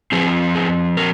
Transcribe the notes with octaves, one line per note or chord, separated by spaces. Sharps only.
F3 C4 G#4
G#4
A#4